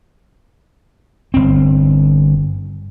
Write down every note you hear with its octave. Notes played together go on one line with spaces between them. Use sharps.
G1 C4